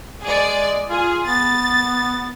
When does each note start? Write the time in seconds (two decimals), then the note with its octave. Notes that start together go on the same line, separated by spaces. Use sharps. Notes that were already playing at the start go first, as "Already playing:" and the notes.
0.22 G#3 G#4 D5
0.89 F4 G#4
1.26 B3 A6